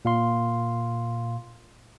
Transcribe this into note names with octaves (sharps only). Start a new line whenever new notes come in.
A#2 F5 C6